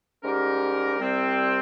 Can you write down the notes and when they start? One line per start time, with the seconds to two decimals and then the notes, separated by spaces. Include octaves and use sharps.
0.23 G#2 G3 C#4 G4 A#4
0.99 C2 C3 G3 C4